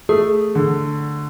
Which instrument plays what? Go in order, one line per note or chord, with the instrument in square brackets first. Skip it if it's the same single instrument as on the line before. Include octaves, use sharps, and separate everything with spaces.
[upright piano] A3 [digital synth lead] G#4
[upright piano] D3